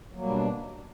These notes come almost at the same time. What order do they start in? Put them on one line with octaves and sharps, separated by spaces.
F#3 A#3 G3 B2 D4